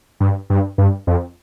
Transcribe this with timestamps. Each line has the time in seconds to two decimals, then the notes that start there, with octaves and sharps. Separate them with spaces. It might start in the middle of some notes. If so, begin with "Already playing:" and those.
0.20 G2
0.50 G2
0.78 G2
1.07 F2